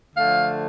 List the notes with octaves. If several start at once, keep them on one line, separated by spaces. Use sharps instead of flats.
D3 F3 A3 F5